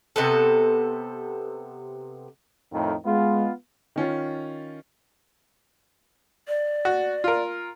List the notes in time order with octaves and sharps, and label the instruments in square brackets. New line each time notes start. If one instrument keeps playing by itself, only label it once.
[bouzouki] C3 B3 A4
[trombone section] F2 A2 D#3
[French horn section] G#3 [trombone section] B3 F4
[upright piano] D#3 C#4 F4
[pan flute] D5
[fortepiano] F#4
F4 A#4